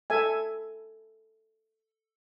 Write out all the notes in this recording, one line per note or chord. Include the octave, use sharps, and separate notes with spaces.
A4 E5 G#5